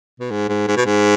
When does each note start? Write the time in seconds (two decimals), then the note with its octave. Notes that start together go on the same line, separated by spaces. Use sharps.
0.20 B2
0.31 G#2
0.49 G#2
0.68 G#2
0.77 B2
0.86 G#2